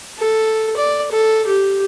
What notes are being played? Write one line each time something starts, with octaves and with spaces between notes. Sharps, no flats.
A4
D5
A4
G4